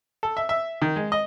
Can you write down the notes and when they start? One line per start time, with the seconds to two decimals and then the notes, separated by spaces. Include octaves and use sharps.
0.23 A4
0.37 E5
0.49 E5
0.82 D#3
0.96 G#3
1.12 D#5